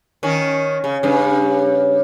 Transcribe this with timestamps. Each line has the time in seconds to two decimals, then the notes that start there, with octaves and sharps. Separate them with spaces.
0.23 D#3 C#4
0.84 C#3
1.03 G2 C#3